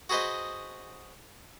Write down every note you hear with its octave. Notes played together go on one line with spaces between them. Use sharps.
F#4 G#4 B4 C5 D#5